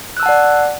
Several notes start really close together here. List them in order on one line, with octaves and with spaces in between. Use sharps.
F#6 E6 A5 F#5 D5